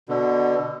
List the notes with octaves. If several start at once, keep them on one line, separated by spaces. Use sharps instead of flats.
B2 D3